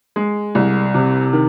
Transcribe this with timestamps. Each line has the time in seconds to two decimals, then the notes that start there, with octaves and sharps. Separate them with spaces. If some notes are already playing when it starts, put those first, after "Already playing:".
0.16 G#3
0.55 C2
0.94 C3
1.33 D#3